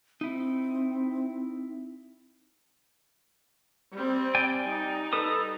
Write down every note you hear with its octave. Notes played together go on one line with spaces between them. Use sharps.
C4 D#4 E4
G3 C4
D5 G5 G#5
G3 D#4
A4 B4 D#6